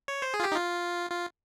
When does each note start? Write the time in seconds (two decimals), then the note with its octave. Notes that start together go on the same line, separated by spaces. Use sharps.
0.08 C#5
0.22 C5
0.34 G#4
0.40 F4
0.44 G4
0.52 D#4
0.55 F4
1.11 F4